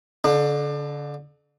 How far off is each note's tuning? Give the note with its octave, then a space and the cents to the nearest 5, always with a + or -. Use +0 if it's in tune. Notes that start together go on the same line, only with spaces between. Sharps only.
D3 -35 D4 +30